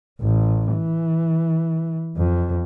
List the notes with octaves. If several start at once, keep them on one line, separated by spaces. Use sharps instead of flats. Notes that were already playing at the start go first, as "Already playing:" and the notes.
A1
E3
F2